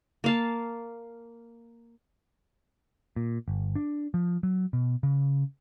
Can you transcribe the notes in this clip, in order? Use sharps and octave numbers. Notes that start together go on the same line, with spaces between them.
A#3 F5 A5
A#2
G1
D4
F3
F#3
B2
C#3